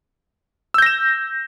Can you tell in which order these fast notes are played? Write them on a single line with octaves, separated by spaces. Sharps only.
E6 G6 A#6 E7